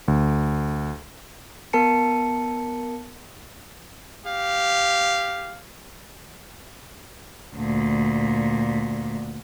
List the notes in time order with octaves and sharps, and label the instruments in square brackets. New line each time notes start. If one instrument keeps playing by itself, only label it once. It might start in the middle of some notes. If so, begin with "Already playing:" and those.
[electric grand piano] D2
[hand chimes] B3 A#4 A5 C#7
[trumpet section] G4 F5
[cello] D2 A#2